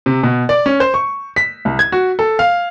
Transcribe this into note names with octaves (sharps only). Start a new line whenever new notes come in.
C3
B2
D5
C#4
C5
C#6
B6
C2
G#6
F#4
A4
F5